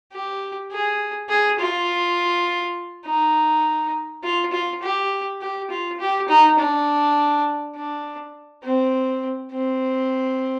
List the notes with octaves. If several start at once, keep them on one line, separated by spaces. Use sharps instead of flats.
G4
G#4
G#4
F4
D#4
F4
F4
G4
G4
F4
G4
D#4
D4
D4
C4
C4